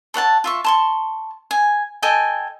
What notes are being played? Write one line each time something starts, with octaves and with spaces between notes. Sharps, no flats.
A4 C#5 F#5 A5
F4 E5 C#6
A5 C6 C#6
G#5
A4 D#5 G5 G#5